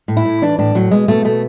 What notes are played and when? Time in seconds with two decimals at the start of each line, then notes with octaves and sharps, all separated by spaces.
0.08 A2
0.17 E4
0.25 A2
0.42 E3 D4
0.59 A2 D4
0.75 A2 F#3
0.91 B2 G#3
1.08 B2 A3
1.24 B2 A3